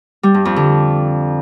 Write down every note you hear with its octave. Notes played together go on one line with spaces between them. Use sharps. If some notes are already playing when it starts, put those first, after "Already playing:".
G3
G2
F2
D3